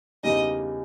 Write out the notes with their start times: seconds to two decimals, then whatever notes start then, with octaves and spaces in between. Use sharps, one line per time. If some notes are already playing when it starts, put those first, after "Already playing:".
0.23 E2 C#3 G3 A#3 D#4 D#5